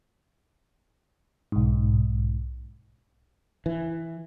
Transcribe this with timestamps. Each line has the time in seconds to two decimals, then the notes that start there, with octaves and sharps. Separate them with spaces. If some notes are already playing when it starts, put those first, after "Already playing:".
1.52 B1 G#2
3.66 E3